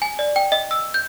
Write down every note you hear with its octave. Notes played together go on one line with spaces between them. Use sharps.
G#5
D5
G5
D#5
E6
G6